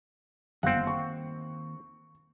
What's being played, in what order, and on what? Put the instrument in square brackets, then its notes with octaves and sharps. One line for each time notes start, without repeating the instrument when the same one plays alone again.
[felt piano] G1 F5 [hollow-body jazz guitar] D#2 [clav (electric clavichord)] C4 F#5
[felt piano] C#6